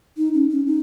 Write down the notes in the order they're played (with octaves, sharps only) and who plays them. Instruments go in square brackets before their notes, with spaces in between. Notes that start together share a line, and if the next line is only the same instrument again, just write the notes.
[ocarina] D#4
C#4
C#4
D#4